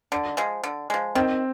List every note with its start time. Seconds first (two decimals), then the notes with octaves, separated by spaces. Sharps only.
0.12 D3
0.37 F3 G#3
0.64 D3
0.90 F3 G#3
1.15 D#3 C4